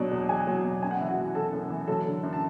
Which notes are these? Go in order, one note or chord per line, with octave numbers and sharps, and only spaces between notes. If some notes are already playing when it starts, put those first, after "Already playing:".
Already playing: B2 F#3 D4 D5
E2
E2 G#4 G#5
F#3
B2
F#2 G#5
F#5
E3 E5
F#4 F#5
E3
F#2 A4 A5
F#2
E3
F#3 A4 A5
D3
F#2
A5